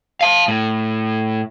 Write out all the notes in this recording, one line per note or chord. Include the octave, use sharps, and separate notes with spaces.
F5 A5
A2